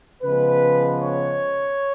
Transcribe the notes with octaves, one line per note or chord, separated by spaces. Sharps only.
C#3 F3 G#3 B3 B4
C#5